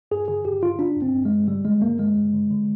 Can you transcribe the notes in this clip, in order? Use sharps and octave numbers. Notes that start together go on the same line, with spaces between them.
G2 G#4
D3 G#4
G2 G4
D3 F4
D3 D4
G2
C4
G2
G2 G#3
D3 G3
D3 G#3
G2 A#3
D3 G#3
G2
D3
D3